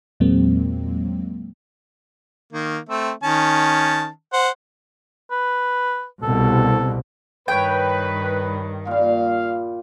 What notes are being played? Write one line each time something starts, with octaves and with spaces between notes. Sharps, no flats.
E2 A#2 F#3 G#3 A#3 C4
D#3 A#3
A3 C4 E5
D#3 C#4 A5
C5 F#5
B4
C2 B2 A4
G2 D#3 B4 C#5 G5
A#2 G3 F5